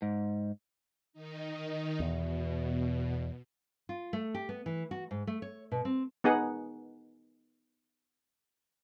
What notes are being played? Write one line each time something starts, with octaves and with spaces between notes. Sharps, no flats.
G#2
D#3 D#4
E2 B2
F4
A3
G4
B3
E3
F#4
G#2
A3
C#5
B2
C4
B3 D#4 G#4 F#5